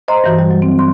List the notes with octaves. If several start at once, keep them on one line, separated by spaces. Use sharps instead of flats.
C5 D#5 A#5 C6
G2 E3 F#4
G3
F#3
C4
C6